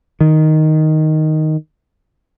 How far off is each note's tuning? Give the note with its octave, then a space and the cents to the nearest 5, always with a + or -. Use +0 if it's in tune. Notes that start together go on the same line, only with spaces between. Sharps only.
D#3 +0